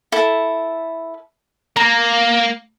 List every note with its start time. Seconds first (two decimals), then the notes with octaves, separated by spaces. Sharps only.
0.12 E4 A4
1.76 A#3 A#5